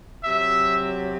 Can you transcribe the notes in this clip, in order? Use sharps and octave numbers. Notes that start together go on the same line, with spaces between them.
C3 F#3 E5